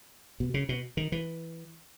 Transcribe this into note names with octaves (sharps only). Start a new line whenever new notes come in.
B2
C#3
B2
D#3
E3